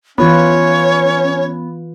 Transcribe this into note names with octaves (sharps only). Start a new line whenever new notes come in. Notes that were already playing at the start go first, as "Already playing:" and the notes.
E3 B3 C#4 F4 B4 C#5